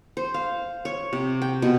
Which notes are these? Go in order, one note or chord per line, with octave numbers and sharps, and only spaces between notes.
C5
F5
C#5
C3
G5
B2